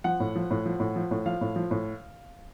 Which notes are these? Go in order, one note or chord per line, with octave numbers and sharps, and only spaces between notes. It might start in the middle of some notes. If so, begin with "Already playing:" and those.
F3 F#5
A2
F3
A2
F3
A2
F3
A2
F3 F5
A2
F3
A2